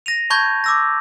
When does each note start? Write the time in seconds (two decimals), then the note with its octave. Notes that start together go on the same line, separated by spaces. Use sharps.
0.06 A#6 D#7 F7
0.30 A5 B5 C#6 G6 G#6
0.64 D6 E6 A#6